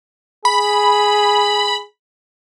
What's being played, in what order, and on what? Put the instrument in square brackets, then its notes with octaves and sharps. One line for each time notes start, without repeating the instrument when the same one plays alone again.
[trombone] G#4 [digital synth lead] B5